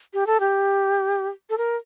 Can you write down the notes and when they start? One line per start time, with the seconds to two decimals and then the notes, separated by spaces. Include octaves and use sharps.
0.14 G4
0.27 A4
0.40 G4
1.50 A4
1.58 A#4